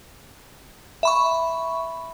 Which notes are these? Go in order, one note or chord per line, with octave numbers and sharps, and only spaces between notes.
E5 B5 C#6